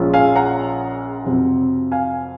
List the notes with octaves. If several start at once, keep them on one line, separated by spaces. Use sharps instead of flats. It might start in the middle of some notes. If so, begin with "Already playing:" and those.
Already playing: A#1 A#2 G#3 C#4 F4
F5 G#5
F#5 A#5
F2 C3 F#3 C4
F5 G#5